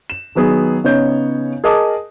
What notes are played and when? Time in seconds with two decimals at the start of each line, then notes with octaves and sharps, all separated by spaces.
0.10 E7
0.35 D#3 F#3 B3 G#4
0.84 C#3 B3 D#4 C#5 G6
1.64 G#4 A#4 D#5 A5 D6 D#6